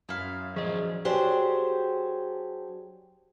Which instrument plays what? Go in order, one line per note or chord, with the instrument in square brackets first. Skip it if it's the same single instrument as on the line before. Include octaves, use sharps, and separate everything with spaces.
[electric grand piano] F#2 [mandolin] E4 F5
[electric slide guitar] F3 C5 D5 [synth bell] G#4 D#5
[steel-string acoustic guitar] F#3 D4 G4 G#4 C5